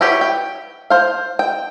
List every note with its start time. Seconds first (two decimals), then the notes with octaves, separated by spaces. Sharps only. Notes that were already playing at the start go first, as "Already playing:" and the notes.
0.01 E4 F#4 G4 B4 C#5
0.21 G5
0.90 C5 F5
1.39 G5